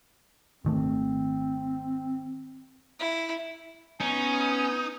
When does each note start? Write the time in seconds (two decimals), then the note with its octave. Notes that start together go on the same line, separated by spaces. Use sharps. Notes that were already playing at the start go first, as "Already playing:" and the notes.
0.65 G#1 D#3 A3 C4
2.99 E4
4.01 B3 C#4 D#4 G#5